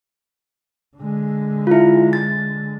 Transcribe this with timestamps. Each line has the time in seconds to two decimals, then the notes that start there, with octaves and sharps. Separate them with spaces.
0.97 D3 G#3
1.67 E4 F4
2.13 A6